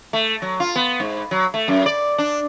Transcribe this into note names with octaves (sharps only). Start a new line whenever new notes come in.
A3
F#3
F4
B3
G#2
F#3
A3
F#2
D5
D4